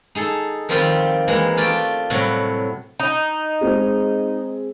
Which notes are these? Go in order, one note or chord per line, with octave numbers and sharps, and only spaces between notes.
D#4 G#4 A4
D#3 F3 G3 C4 F4 G4
E3 G#3 A#3 A#4
A3 F4 G4 D5
A2 C3 F#3 G3
D#4
G#3 C4 G#4